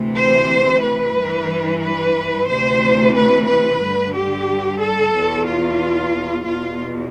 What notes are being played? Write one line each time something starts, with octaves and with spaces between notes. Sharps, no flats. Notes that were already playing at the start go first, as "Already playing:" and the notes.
Already playing: D2 C3 E3
C5
B4
G2
E3
B4
D2 C3 E3 C5
B4
B4
G2 D3
G4
A4
E2 B2
F4
E2 B2 F4